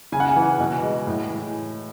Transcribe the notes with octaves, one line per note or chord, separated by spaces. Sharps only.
C#3 G#5
F#5
G#5
E3
B2
G#3
A2
E3